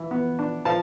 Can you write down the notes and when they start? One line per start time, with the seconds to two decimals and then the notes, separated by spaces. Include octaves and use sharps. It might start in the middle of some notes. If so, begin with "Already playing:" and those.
Already playing: E3
0.11 B3
0.39 D4
0.65 F3 F5 A5